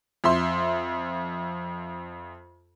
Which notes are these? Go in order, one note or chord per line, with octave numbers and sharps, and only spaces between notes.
F2 E5 C6